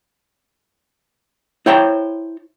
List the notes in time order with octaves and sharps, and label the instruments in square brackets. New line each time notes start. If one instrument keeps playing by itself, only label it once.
[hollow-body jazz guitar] E4 C5 C#5 G5 A5 A#5